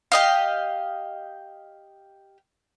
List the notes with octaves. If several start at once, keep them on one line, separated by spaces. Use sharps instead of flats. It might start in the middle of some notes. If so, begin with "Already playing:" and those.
G4 D#5 F5